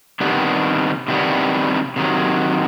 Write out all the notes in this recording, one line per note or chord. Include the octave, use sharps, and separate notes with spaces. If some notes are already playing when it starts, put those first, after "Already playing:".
C3 D#3 G3 B3 D4
C3 D#3 G3 B3 D4
C3 D#3 F#3